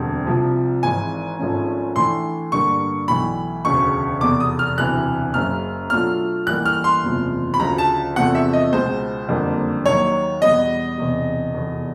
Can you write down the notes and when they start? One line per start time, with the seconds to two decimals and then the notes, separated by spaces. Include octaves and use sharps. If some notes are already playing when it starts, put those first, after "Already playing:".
Already playing: E1 D2 D3 G3 C4
0.27 C2 C3 F3
0.83 G#1 G#2 E3 G#5
1.39 G#1 G#2 F3 A3 C#4
1.96 A2 E3 A3 D4 C6
2.52 G2 D3 G3 A#3 D4 C#6
3.08 B1 A2 E3 B5
3.65 E1 D2 C#3 C#6
4.21 F1 E2 B2 D6
4.40 D#6
4.59 F6
4.78 E1 D2 C3 E3 F#6
5.34 F#1 F#2 C#3 F6
5.90 B2 F#3 A3 D4 F4 F6
6.47 A1 A2 E3 G3 A#3 F#6
6.65 F6
6.84 C6
7.03 F#1 E2 C3 F3
7.54 B5
7.59 D2 C#3 F3 A#5
7.78 A5
8.16 E2 C3 F3 A3 C4 F#5
8.35 E5
8.53 D#5
8.72 C#2 B2 G#3 C5
9.29 F#1 F2 D3 G3 A#3
9.85 D#2 D#3 F#3 C#5
10.42 E2 B2 G3 B3 D#5
10.98 E1 E2 C3
11.54 F1 E2 B2